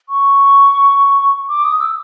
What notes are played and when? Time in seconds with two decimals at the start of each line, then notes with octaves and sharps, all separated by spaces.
0.09 C#6
1.49 D6
1.64 D#6
1.80 E6